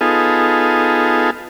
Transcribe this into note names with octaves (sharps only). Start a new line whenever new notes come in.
B3 D#4 F4 G#4 A4